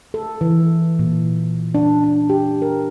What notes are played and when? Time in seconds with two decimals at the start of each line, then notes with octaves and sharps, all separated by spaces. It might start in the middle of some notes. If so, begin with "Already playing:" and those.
0.14 A4
0.41 E3
0.99 A#2
1.75 D4
2.04 D4
2.30 G4
2.62 A#4